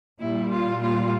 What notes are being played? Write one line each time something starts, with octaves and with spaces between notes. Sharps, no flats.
A#2 G3 E4
F4
F4